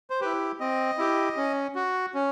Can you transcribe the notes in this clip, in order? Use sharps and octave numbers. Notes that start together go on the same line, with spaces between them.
C5
E4 G4 B4
C4 D#5
E4 G4
C#4
F#4
C#4